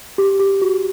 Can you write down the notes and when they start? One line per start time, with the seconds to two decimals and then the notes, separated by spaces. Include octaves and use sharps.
0.18 G4
0.39 G4
0.62 F#4